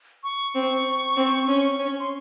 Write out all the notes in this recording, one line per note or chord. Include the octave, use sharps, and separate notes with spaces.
C#6
C4
C4
C#4
C#4
C6